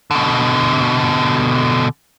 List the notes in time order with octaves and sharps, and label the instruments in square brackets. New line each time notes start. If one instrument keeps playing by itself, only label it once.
[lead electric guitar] B2 D3